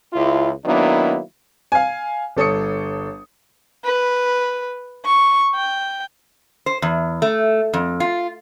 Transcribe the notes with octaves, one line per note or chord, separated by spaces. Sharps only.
C#2 E4 F4
D#3 F#3 A#3 B3 D4 E4
F5 G#5
G1 A4 C#5 D#6 C#7
B4
C#6
G5
C5
E2
A3
F2
F4